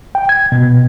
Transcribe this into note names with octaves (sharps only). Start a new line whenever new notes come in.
G5
G#6
B2